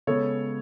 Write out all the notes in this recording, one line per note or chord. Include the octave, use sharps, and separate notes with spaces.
C#3 G#3 B3 A4 C#5